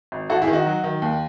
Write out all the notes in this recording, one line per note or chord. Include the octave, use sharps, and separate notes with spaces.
G#1
G#1 F#4 A4
E4 G#4
D#3
D#4 F#4
F#3
D#3
D#2